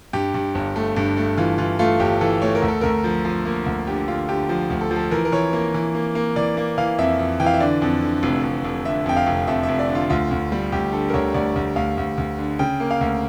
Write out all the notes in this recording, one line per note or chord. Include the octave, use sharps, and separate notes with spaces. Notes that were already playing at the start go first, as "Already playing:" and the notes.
G2 G4
G2
G1
A3
G2
A3
E3 F4
E3 F4
A3 F4
G1 G4
E3 A4
A3 C#5
A#4
D2
A4
D2 A#4
F3
F3
A#3
D2
D3 G4
D3 F4
D3 G4
F3
D2
A4
F3
A4
E3 A#4
A#4
E3 C#5
A#3 A#4
E3
A#3
A#3
E3 D5
A#3
E3 F5
F2 E5
F2
E3 G5
F5
E5
D3 D5
F2
D3
F1
F1
F1
D3 E5
F2 G5
F5
F1
F2 E5
E5
F1
D5
D3
F4
D2 F4
D2
G3
D2 G4
D3 A4
A#4
D2 C#5
D2 D5
D2
D2 F5
D2
D2
D3
C#3 G5
A#3
F5
D2